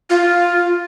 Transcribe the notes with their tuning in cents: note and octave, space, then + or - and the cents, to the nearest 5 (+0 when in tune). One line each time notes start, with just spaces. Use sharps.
F4 +0